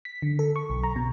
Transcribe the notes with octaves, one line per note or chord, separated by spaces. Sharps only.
B6
D3
A4
C#6
B1
A#5
B2